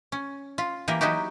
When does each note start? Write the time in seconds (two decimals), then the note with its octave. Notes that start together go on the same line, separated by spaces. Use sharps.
0.12 C#4
0.58 F4
0.88 E3 A#3 G4 A#4
1.01 F#3 D#4 E4 F#4 G4